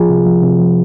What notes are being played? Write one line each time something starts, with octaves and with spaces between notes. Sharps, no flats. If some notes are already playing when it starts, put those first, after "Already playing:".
Already playing: F3 F4 G#4
C3
F3
C3
F3